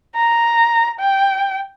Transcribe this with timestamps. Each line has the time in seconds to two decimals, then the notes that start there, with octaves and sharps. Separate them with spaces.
0.16 A#5
1.00 G5